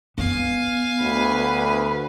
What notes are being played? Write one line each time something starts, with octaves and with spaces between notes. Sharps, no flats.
B3 F5 G#5
D2 B4